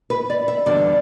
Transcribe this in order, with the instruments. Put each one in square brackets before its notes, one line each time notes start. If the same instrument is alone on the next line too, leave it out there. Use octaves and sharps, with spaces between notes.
[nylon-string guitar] B4
D5
E5
E2 D3 G3 D5